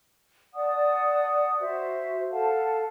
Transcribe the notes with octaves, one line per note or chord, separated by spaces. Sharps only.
D5 F#5 A5 D#6
F#4 C5 E5
A4 F5 F#5 A5